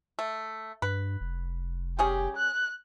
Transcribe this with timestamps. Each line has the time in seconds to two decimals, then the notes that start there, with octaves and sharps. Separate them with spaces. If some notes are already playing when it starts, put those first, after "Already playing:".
0.19 A3
0.82 G2 B4
1.21 F1
1.99 G3 C#4 G4 G#4
2.37 F#6